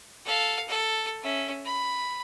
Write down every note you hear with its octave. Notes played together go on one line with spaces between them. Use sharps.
A4 F5
A4
C#4 E5
B5